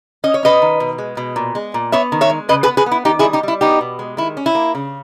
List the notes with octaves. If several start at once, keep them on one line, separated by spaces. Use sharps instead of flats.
C#4 D#5
C#5
C#4 B4 D#5
D#3
B2
G#3
B2
A#2
G#3
A#2
B3 C#5 E5
D#3
C#5 E5
G#3
C#3 B4 D#5
G#4 B4
B3
G#4 B4
B3
E4
D#3 D#4 G4
E4 G#4
G3
D#4 G4
G3 E4
B3 D#4 G4
B2
G#3
D#3 E4
C#4
E4
A#3
C#3